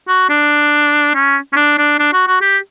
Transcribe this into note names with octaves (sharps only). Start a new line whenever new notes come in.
F#4
D4
C#4
C#4
D4
D4
D4
F#4
F#4
G4